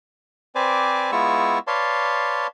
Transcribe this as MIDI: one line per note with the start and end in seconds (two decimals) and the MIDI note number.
0.55 1.11 60
0.55 1.11 71
0.55 1.11 72
0.55 1.11 74
0.55 1.11 80
0.55 1.11 86
1.12 1.59 56
1.12 1.59 59
1.12 1.59 64
1.12 1.59 65
1.12 1.59 85
1.12 1.59 88
1.67 2.47 71
1.67 2.47 73
1.67 2.47 74
1.67 2.47 77
1.67 2.47 81
1.67 2.47 84